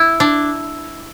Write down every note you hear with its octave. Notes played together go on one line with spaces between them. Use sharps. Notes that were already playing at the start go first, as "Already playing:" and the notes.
Already playing: E4
D4